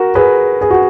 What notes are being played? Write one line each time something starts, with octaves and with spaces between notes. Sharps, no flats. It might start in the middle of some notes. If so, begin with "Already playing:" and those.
Already playing: F#4 A#4
G#4 B4
G#4
F#4